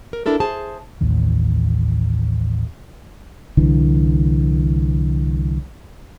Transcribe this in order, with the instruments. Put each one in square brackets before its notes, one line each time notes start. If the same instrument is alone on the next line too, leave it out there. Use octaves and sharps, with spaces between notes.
[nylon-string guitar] A#4
D4 E4 A4 A#4
G#4 C5 A5
[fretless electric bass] A1 D#2
[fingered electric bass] C2 D3 E3